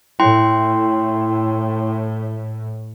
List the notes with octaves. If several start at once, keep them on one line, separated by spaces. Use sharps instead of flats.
A2 E4 G5 C6